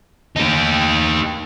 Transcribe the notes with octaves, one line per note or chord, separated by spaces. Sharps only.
D#4 G4